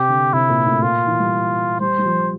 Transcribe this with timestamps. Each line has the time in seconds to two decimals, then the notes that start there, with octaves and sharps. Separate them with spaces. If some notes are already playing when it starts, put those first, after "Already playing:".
Already playing: C3 G4
0.09 D3
0.33 C3 E4
0.50 A#2
0.66 A2
0.82 A#2 F4
1.07 E3
1.19 G3
1.80 G3 C5
1.98 G3
2.05 F3